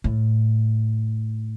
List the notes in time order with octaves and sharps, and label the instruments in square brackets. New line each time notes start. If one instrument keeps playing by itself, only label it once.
[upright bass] A2